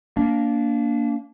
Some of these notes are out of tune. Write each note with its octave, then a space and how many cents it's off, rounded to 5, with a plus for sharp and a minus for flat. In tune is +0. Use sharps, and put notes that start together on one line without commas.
A#3 +0 D4 -25